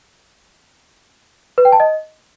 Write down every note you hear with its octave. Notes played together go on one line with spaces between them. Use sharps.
B4
G5
A5
D#5